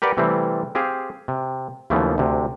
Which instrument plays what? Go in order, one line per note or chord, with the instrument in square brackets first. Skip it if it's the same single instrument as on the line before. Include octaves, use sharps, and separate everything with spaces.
[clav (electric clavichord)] G4 A#4 B4 D5 F#5
C3 E3 G3 A3 C4
C4 G4 G#4 F5
C3
D#2 C#3 E3 F3 A3 B3
D2 C3